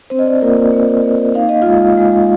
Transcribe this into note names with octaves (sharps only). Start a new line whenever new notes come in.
C4 D4 C5
D#5
D5
C5
A#3 F4 A#4
A#3
A#3
D#4 F5
D#5
G#3 F4 F5
G#3